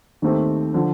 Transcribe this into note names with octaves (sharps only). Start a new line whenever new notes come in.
D#2 D#3 A3 C4 G4
D3 F3